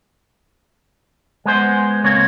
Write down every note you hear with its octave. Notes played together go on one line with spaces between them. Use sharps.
G#3 B3 C5
C#2 A#3 C4 C#5